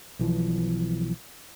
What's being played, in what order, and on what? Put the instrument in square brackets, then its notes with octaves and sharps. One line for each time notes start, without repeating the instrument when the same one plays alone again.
[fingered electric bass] B1 E3 F3